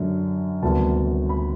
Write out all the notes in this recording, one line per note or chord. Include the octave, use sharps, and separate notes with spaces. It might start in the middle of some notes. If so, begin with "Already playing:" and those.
Already playing: F#2 D3
D2 C3 D#3 G3 B3 A5
B5